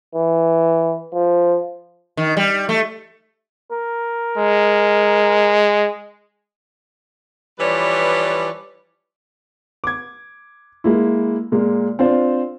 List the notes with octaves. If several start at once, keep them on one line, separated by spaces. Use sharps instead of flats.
E3
F3
D#3
G3
A3
A#4
G#3
E3 F3 G3 B4 C#5 D5
D6 G#6
G#3 A#3 E4
A#2 G#3 A#3
C4 D4 F4 C5